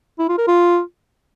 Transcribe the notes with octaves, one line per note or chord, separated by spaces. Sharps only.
E4
F4
A#4
F4